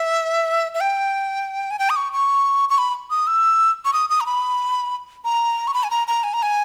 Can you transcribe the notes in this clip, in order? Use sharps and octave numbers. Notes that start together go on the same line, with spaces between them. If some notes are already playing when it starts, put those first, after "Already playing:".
Already playing: E5
E5
G5
G#5
G5
D#6
C#6
C#6
C#6
B5
D#6
E6
C#6
D#6
D#6
A#5
B5
A#5
C#6
B5
G#5
A#5
A#5
G#5
A#5
G#5